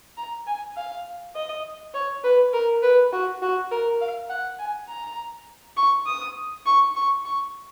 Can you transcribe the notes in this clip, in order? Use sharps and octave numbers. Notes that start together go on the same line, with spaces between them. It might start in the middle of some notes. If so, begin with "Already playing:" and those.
A#5
G#5
F5
D#5
C#5
B4
A#4
B4
F#4
F#4
A#4
F5
F#5
G#5
A#5
C#6
D#6
C#6
C#6
C#6